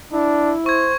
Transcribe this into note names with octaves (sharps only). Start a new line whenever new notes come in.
D4 E4
C5 C#6 G#6